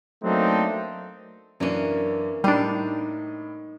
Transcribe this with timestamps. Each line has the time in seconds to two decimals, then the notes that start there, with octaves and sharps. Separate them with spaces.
0.22 F#3 A3 A#3 C4 D4 D#4
1.60 F#2 E3 A#3 C#4 D4
2.44 A2 G3 D4 D#4 C5